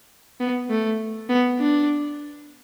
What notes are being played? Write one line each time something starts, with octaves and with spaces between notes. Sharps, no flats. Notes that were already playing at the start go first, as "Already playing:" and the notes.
B3
A3
B3
D4